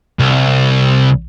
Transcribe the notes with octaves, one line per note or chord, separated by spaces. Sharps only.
C2